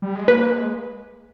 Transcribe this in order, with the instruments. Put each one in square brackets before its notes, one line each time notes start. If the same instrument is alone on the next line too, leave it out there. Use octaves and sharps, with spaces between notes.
[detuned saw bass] G3
G#3
[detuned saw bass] A#3 [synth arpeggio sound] B4
[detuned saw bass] G#3